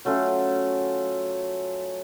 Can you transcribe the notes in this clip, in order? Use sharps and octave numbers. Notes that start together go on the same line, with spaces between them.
F#3 A3 C#4 F4